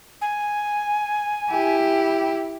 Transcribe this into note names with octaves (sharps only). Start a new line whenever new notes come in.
G#5
E4 G4